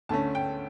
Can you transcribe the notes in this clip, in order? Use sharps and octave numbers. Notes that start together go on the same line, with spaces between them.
D2 D3 A3 C#4 A5
G5